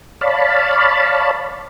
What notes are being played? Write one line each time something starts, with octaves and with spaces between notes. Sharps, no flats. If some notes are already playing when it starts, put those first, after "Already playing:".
C#5 D5 F5 A5 B5